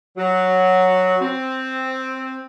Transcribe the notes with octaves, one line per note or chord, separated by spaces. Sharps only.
F#3
C4